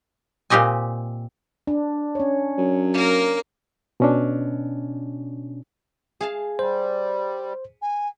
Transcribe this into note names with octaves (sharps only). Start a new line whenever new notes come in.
A#2 C4 G4 D#5 G#5
D4
C#4 C#5
F#2
A#3 A#4
B2 C#4 D4
G#4 F5 A5
G3 C5
G#5